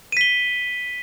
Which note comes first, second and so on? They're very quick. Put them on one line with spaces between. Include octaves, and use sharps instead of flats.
D#7 B6 G7